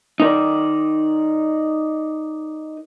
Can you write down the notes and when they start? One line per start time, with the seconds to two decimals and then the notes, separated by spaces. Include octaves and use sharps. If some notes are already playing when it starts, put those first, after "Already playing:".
0.20 D#4 A#4 D5